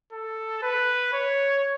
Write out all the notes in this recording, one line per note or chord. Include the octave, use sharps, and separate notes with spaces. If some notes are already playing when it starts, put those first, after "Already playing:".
A4
B4
C#5